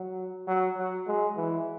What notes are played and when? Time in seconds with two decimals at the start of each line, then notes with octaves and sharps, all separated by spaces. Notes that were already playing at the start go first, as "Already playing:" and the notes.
Already playing: F#3
0.47 F#3
0.77 F#3
1.07 G#3
1.37 E3